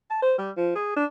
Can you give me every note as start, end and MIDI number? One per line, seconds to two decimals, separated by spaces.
0.10 0.18 81
0.22 0.33 72
0.38 0.51 55
0.57 0.73 53
0.75 0.92 68
0.96 1.05 62